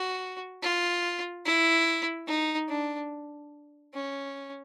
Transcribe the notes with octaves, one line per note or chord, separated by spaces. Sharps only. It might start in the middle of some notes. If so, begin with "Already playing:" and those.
Already playing: F#4
F4
E4
D#4
D4
C#4